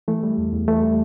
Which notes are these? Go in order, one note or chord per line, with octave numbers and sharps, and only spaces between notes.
E3 A3
G3
E2
E2
E3 A3
G3